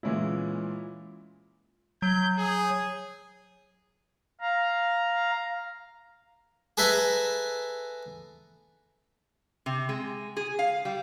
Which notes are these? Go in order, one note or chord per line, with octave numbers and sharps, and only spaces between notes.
A#2 E3 G#3 C#4 E4
F#3 G6
G#4
F5 A#5
G#4 A4 B4 E5 G#5 A#5
C3
G#3
G#4
F5
G3